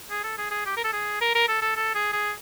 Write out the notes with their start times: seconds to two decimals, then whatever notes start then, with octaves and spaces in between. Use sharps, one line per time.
0.10 G#4
0.24 A4
0.38 G#4
0.51 G#4
0.66 G4
0.77 A#4
0.84 A4
0.93 G#4
1.21 A#4
1.35 A#4
1.48 A4
1.62 A4
1.77 A4
1.95 G#4
2.13 G#4